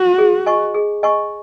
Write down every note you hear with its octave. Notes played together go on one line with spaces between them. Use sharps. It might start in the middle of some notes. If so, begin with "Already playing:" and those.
Already playing: F#4
G#4
D#5 G#5 C#6
G#4
D#5 G#5 C#6